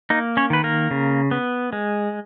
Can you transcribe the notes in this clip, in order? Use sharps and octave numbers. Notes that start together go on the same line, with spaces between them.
A#3 D#4
C#4 C#5
D#3 B4
A#3 A#4
C#3
B3
G#3